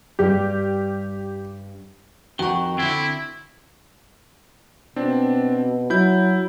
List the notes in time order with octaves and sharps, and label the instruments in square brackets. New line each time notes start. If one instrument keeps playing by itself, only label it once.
[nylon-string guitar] G2 G3 [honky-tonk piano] G4
[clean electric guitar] F2 D#3 [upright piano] F#4 [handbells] G5 C#6
[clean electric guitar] D3 C4 [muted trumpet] E4
[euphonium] B2 [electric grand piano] C4 D4
[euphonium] F#3 [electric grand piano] E4 G6